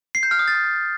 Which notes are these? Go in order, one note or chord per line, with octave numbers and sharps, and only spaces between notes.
C7
G6
F6
D#6
A6